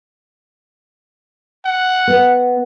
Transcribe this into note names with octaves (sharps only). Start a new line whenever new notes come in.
F#5
B3